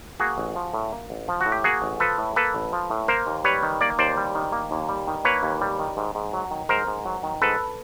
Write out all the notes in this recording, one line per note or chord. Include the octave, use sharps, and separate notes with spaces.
A#3 F#4 G#4
A1
F3
A2
A#3
A1
F3
F#4
A2
G4
A#3 F#4 G#4
A1
F3 A4 B4
A2
A#3 A4 B4
A1
F3
A2
A#3 A#4 C5
D#2
G3 B4 C#5
D#3
A#3 D5
D#2 C5 D5
G3
D#3
A#3
D#2
G3
D#3
A#3 B4 C#5
D#2
G3
D#3
G#2
G#2
F#3
D#3
G#2 A#4 C5
G#2
F#3
D#3
G#2 A4 B4